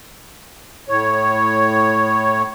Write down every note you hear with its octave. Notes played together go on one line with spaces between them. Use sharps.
A2 C#5